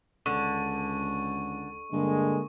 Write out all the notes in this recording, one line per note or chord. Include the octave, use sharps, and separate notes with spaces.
C#2 D3 C#6
G2 D3 G#3 A#3